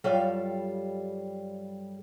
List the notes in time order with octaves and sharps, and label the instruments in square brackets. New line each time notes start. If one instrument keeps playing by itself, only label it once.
[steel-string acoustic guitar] G2 F#3 G3 F4 A4 F5